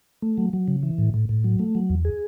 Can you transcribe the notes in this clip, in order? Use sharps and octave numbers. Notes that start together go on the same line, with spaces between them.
A3
F#3
F#3
C#3
E3
A2
A2
A2
F#3
A3
F#3
E2
G#4